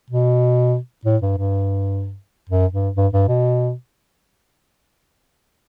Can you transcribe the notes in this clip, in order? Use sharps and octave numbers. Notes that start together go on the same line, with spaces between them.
B2
A2
G2
G2
F#2
G2
G2
G2
B2